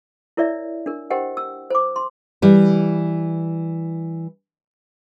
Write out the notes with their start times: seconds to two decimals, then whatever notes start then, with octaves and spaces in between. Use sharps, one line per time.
0.37 E4 A#4 C#5 D5 E5
0.86 D4 A#4
1.10 G4 A#4 C5 D#5 F#5 G5
1.37 E6
1.70 C5 D6
1.96 C6
2.42 E3 G3 E4